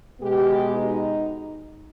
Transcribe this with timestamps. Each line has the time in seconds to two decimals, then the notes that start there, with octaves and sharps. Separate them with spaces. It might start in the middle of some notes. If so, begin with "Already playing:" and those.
0.21 B2 G#3 B3 G4
0.76 D#4